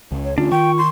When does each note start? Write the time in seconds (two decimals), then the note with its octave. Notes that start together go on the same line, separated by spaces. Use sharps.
0.12 C#2
0.24 C#5
0.38 D2 D3 C#4 D4 F4
0.52 D#3 G5 C#6
0.78 C6